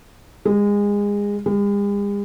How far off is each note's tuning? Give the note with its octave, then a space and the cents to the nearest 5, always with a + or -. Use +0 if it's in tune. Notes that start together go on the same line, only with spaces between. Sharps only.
G#3 -25
G#3 -45